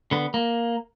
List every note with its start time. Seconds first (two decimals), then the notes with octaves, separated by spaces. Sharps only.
0.11 D3 B3
0.34 A#3